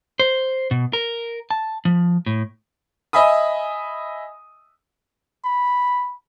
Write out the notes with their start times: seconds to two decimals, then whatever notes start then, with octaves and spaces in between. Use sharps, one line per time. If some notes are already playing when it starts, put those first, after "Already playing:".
0.20 C5
0.71 B2
0.93 A#4
1.51 A5
1.85 F3
2.26 A2
3.13 D#5 E5 G#5 B5 D#6
5.45 B5